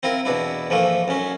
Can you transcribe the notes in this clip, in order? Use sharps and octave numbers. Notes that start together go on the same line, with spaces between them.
C4 E4 F4 A#4
E2 B2 D4 E4
G#2 E3 F3 A3 A#3
F#2 C#4